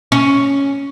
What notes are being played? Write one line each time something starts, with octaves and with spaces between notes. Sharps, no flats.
C#4